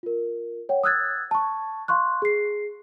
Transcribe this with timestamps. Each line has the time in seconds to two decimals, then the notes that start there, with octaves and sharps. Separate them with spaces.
0.03 F4 A#4
0.69 C#5 F#5 G5
0.83 D#6 E6 F#6 G#6 A6
1.31 A5 C#6
1.88 F5 C6 C#6 F#6
2.22 G#4 C7